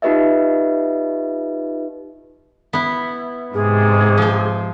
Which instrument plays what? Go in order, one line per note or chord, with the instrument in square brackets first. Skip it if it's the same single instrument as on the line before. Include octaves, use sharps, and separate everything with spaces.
[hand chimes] D#4 F4 G4 B4 D#5 E5
[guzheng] B3 E4
[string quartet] G#2 C3 [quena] G#4
[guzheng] F3 C5